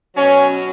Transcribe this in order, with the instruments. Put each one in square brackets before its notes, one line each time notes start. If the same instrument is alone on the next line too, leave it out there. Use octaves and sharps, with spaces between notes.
[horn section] B2 F#3 C#4